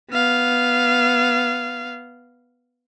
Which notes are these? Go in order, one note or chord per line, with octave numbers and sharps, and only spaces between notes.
B3 F5